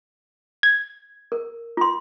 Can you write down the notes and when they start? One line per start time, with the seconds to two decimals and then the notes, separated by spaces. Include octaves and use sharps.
0.63 G#6
1.32 A#4
1.77 F4 C6